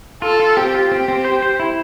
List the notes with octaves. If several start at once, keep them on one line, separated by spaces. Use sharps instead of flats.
F4 A4
F4
C4 G4
F4
C4 G4
C4
C5
C5
E4